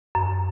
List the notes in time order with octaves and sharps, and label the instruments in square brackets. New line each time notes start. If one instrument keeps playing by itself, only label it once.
[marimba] F#2